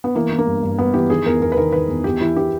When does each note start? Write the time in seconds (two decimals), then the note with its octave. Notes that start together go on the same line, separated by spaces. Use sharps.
0.04 B3
0.15 E3 A#3
0.32 E3
0.38 A#3
0.47 G2
0.63 G2
0.78 G2 B3
0.94 E3 G4
1.10 D#3 G#4
1.26 E2 A#4
1.41 E2 A#4
1.52 B4
1.57 D#3 A#4
1.72 D#3 B4
1.89 E2
2.04 E2 G4
2.21 E3 E4
2.36 G4